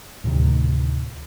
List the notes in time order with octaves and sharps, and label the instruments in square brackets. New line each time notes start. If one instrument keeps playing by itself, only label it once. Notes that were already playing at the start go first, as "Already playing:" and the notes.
[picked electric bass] D2 A2 C3 D#3